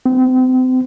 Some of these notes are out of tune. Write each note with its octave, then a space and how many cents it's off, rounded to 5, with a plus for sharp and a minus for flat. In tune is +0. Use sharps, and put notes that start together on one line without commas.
C4 -35